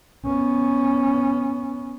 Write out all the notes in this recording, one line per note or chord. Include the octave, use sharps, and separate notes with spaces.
B3 C#4